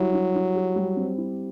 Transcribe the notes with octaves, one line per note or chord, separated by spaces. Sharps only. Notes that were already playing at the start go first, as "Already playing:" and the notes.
Already playing: F#3 G3 E4
E4
E4
G4
G3
C4
E4